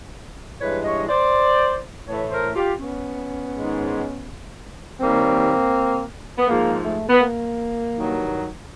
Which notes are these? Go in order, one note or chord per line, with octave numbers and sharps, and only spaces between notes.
G2 E3 G#3 B4 C#5
C#5 D#5
D#5
C5 D5
A2 E3 A3 B4 C#5
A#4 C5
F4 G4
B3 C#4
G#2 D#3 G#3
D#2 D#3 G3 A#3 C4
B3
G#2 F3 G#3 A#3
A3
B3
A#3
G2 D#3 F#3